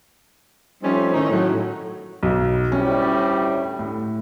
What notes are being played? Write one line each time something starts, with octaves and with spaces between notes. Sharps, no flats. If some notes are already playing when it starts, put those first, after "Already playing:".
F3 G3 A3 C4 C#4 D#4
A2 D#3 C#4 D#4
A2 F#3
B1
D2 A2 G3 C#4
A2